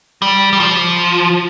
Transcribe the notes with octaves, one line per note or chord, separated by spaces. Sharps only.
G3
G3
F3